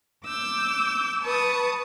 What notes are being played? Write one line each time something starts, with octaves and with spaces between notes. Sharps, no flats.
D6 E6 G6
B4 A5 C#6 D#6